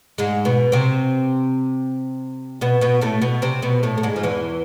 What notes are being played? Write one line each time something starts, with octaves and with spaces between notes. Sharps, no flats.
G#2 G#3
B2 B3
C3 C4
B2 B3
B2 B3
A2 A3
B2 B3
C3 C4
B2 B3
A2 A3
A3
G#2 G#3
F3
E2 E3